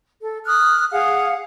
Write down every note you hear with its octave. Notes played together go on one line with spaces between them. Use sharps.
A4
D#6 F6 F#6
G#4 F5 F#5